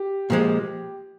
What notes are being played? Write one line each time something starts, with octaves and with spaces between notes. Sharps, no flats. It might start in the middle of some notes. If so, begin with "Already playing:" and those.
Already playing: G4
A#2 F3 G#3